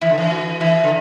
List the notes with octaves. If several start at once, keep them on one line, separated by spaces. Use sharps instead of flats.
E3 E4
D3
E3
F#4
E3 E4
D3